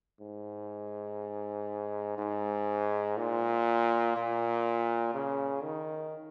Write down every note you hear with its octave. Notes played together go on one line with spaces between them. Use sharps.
G#2
G#2
A#2
A#2
C#3
D#3